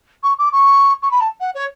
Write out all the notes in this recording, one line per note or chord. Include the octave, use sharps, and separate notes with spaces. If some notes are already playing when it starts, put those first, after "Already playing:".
C#6
D6
C#6
C#6
B5
A5
F#5
C#5